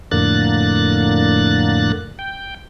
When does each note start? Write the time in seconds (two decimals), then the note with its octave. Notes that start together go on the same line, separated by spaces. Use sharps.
0.11 F2 A2 D3 A#3 F#6 A6
2.19 G5